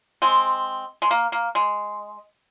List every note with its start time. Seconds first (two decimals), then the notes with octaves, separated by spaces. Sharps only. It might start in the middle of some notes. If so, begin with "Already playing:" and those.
0.22 G#3 C4
1.02 G#3
1.11 A#3
1.32 A#3
1.55 G#3